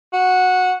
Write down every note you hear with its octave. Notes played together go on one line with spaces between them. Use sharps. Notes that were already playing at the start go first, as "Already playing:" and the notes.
F#4